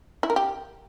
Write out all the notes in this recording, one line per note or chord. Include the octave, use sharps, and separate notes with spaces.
E4
A#4
G4